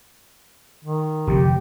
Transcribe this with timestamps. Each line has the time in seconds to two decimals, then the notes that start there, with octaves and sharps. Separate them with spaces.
0.85 D#3
1.27 F1 F2 D3 G4